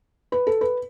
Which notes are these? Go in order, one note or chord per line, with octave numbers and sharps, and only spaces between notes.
B4
A4
B4